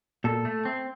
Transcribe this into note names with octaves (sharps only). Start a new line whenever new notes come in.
A#2 A4
A3
C4